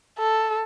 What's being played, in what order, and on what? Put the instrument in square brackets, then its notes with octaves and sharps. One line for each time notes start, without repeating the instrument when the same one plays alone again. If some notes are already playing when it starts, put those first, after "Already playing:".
[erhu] A4